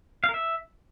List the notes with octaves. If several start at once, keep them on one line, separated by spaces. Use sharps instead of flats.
F5
A#4
E5